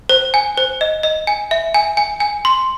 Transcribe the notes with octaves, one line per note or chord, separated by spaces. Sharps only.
C5
G#5
C5
D#5
D#5
G#5
E5
G#5
G#5
G#5
C6